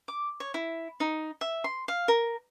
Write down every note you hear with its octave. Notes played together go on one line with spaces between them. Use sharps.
D6
C#5
E4
D#4
E5
C6
F5
A#4